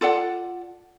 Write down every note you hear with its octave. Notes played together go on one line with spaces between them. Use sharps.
F4 A4 D5 F#5